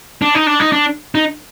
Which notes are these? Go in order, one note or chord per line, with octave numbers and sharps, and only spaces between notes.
D4
D#4
D4
D#4
D4
D#4